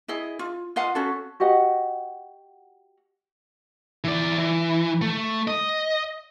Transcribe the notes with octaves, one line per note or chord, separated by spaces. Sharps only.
E4 G#4 D#5
F4
F4 D#5 F5 F#5
C#4 F#4 A4
F#4 G4 D#5 F#5
E3 D5
E3
A3
D#5